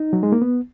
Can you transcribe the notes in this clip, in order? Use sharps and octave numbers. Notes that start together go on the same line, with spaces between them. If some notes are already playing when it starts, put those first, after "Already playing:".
Already playing: D#4
F#3
G#3
A#3
B3